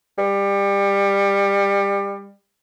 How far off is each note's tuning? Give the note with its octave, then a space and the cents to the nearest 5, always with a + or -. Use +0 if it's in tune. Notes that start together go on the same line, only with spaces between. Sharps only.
G3 +25